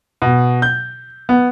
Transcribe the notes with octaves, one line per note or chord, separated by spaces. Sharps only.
B2
G6
B3